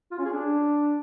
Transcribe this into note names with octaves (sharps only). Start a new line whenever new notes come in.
F4
C#4
G#4
D4